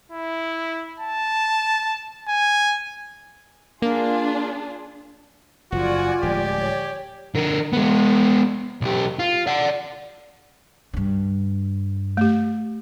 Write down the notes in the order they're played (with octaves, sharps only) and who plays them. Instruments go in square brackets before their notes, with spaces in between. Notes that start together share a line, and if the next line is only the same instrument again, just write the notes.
[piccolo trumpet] E4
A5
G#5
[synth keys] A#3 [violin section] D4 F4 G#4
[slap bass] F#1 F3 [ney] F4 [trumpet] F#4 [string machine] D5 G#5
[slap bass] D1 F3 G#3 [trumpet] G4
[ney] C#5
[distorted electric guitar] D3 A#4
G#3 B3
B1 G4
F4
D5 F#5
[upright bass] G2 D3
[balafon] A3 G4